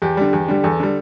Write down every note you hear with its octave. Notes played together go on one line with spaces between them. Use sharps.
E2 G4
D3 G3
E2
D3 G3
E2 A4
D3 G3